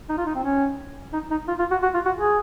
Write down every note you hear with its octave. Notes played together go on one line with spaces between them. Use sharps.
D#4
F4
D#4
C4
C#4
D#4
D#4
F4
F4
F#4
F#4
F4
F#4
G#4